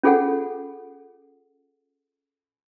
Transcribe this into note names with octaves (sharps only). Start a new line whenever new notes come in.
C#4 F4 G#4 A4 F#5